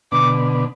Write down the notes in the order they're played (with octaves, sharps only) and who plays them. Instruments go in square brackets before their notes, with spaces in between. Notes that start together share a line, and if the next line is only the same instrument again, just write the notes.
[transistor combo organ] B2 D3 [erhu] D6